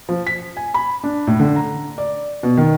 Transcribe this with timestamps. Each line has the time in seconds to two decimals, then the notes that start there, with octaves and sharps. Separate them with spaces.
0.09 F3
0.27 B6
0.57 G#5
0.74 B5
1.04 D4
1.27 A2
1.40 D3
1.56 A#5
1.98 D5
2.43 B2
2.57 D#3